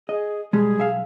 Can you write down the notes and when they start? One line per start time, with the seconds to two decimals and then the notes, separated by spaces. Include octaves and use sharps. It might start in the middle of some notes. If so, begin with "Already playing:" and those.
0.09 G#4 D#5
0.53 B2 G3 G#3 G#4
0.78 B1 E5 F5